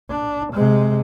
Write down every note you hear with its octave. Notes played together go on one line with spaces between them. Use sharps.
D4
C3 G#3